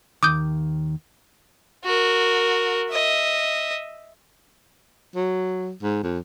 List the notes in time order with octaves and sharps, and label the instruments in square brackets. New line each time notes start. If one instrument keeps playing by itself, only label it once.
[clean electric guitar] D#2 D#3 [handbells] D6 D#6 G6
[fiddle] F#4 A#4
D#5 E5
[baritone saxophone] F#3
G#2
F2